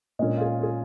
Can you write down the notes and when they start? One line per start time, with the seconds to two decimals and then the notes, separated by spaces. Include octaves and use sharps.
0.19 A#2 G#3 C#4 D#5
0.37 F4
0.41 G#4
0.59 F4
0.63 G#4